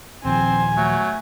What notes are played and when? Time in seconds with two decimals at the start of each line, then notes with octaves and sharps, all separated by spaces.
0.25 D#1 D#2 F3 C4 C5 G#5
0.77 F#3 A3